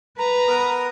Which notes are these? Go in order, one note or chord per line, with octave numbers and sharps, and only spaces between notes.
B4 A#5
B3 A#4 D#6